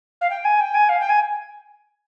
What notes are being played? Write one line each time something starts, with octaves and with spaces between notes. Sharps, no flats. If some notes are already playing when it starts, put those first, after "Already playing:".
F5
G5
G#5
G5
G#5
F5
G5
G#5